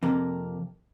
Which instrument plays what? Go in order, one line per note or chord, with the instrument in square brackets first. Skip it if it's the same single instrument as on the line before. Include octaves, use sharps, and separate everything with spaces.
[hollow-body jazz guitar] F2 C3 A#3